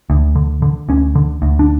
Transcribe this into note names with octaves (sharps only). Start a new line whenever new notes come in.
D2
D3
D3
D2 C#4
D3
D2
D4